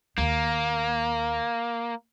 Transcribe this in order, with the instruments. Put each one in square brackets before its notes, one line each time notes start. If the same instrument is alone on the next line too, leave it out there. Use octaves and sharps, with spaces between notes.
[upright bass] D#2 [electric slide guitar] A#3